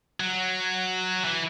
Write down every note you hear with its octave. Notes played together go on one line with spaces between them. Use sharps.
F#3
E3